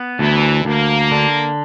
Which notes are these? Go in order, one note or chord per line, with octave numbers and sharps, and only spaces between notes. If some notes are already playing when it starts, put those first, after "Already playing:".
Already playing: B3
D2 E3
D2 A#3
D3